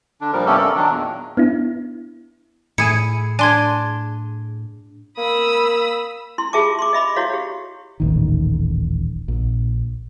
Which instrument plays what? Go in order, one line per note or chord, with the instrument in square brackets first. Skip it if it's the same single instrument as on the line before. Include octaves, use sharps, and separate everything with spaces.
[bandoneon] D3 D4
A#2 F3 G3 A#4
G2 C3 B3 C#4 G4 A4
A4 A#4 D5
D#3 F#3 D4
E2 A#2
[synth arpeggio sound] B3 D4 E4
[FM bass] A2 [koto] E4 G#4 [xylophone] C#7 D#7
[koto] D4 [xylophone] G#5 C6 G#6
[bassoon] A#3 [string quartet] B5 D#6 E6
[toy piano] E4 C6
F4 G4 G#4 E5 A5 D6
C6 D6
D#5 E5 B5 D6
E4 F#4 C#5 F5
G4
[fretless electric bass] D#1 A1 D#3
A#1